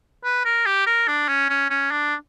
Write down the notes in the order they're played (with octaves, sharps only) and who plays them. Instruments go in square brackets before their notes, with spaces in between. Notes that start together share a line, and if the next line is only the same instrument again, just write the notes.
[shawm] B4
A#4
G4
A#4
D4
C#4
C#4
C#4
D4